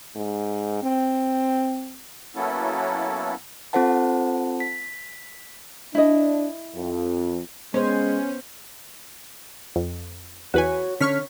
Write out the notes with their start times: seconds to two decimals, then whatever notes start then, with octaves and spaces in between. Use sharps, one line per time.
0.16 G#2
0.82 C4
2.36 F#3 A#3 B3 C#4 E4 A4
3.73 C4 F4 A4 C5 F#5 A5
4.60 B6
5.95 D4 E4 D#5
6.76 F2
7.74 G#3 B3 C#4 C5
9.76 F2
10.54 E2 F#4 B4 C#5 G#5
11.01 D3 C#4 C#5 C#6 F6 B6